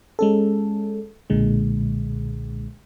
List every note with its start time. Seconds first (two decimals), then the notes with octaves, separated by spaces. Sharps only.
0.19 G#3 C#4 A4
1.30 B1 A#2 D3 G#3